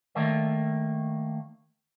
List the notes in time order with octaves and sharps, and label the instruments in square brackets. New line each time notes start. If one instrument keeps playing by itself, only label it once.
[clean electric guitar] D#3 A3 A#3 D5 E5